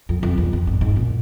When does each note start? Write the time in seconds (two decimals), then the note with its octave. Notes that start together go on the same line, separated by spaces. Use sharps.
0.09 F2
0.23 F2
0.38 E2
0.53 F2
0.67 G2
0.81 G#2
0.96 A#2